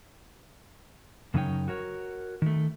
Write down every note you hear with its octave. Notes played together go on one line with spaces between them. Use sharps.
F#2 C#3 F#3 D#4 C#5 G5
F#4 A#4 C#5
D#3 A3